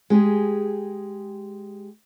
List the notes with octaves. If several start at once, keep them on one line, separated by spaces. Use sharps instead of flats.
G#3 G4 G#4